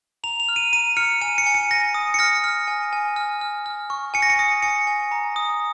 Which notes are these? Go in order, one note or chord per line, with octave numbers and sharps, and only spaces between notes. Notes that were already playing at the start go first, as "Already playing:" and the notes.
A#5 F7
F7
F6
D#7
A#5 D#7
F6 C#7
G#5 D#7
C#7
G#5
C#7
G#5 A#6
D#6
C#7
F6 A#6
F6
G#5
G#5
F6
F6
F6
C#6
G#5 C#7
A#6
C#7
D#6 A#6
G#5 C#7
G#5
A#5
D#6